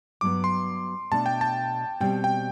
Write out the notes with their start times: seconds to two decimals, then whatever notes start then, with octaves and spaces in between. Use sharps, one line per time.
0.21 G2 F#3 B3 D6
0.44 C6
1.11 B2 A3 D4 A5
1.26 G5
1.41 A5
2.00 B2 G3 C4 G5
2.24 G5